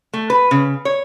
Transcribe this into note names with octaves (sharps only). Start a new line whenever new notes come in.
A3
B4
C#3
C#5